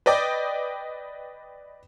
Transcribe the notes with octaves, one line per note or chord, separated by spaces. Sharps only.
B4 D5 D#5 G5 D6